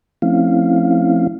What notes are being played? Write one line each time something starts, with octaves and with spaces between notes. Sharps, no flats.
F3 A3 C4 C#4 E4 F5